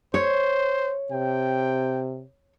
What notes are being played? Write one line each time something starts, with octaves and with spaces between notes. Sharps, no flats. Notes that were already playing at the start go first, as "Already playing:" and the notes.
C5 C#5
C3 G5